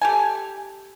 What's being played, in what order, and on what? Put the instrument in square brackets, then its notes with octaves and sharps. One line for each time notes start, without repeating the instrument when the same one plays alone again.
[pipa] G4 A4 G#5